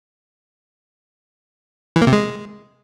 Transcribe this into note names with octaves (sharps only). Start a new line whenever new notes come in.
E3
A#3
C3
G#3